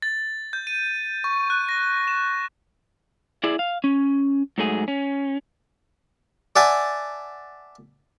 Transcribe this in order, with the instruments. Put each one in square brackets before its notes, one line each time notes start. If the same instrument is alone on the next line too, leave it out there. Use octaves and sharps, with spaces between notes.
[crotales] A6
G6
D#7
C#6
F#6
A#6
E7
[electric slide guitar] E4 G#4 D5
F5
C#4
G#2 F#3 A3 G#4
C#4
[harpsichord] D5 E5 F#5 G#5 A5